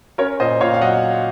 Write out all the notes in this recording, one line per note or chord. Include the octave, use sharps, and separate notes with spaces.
C#4 A#4 C#5
A#2 C5 D#5
A#2 C#5 F5
F5
F#3 D#5 F#5